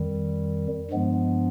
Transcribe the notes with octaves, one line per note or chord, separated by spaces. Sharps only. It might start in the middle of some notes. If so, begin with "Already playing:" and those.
Already playing: F2 D#3 G3
G2 F3 G#3 B3